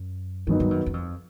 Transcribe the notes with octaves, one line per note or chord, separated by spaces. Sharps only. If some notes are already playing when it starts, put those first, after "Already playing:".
Already playing: F#2
G2 D#3 F#3 B3 D#4
G2
F#2
F#2
F2